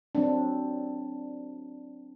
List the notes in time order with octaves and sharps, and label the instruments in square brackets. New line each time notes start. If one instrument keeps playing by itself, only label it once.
[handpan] F#3 C4 D4